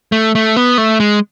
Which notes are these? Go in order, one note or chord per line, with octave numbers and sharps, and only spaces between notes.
A3
A3
B3
A3
G#3